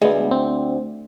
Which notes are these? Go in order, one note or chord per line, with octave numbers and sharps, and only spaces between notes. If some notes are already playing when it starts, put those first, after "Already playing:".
D2 G#3 B3
C4